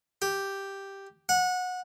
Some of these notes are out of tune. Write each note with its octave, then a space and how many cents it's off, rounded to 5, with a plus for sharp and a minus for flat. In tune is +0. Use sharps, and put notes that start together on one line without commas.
G4 +0
F#5 -20